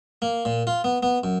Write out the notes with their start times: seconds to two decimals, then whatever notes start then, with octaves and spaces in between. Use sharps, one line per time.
0.22 A#3
0.45 A#2
0.67 F4
0.84 B3
1.03 B3
1.24 F#2